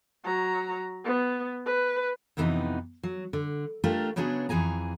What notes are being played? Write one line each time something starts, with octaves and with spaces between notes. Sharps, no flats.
F#3 A#5
B3
B4
F2 C3 E3 B3 C#4 D#4
F#3
D3
A3 D4 F4 G4 A#4
C#3 F#3 B3 D4 G#4
F2 E3 G#4 G#5 A#5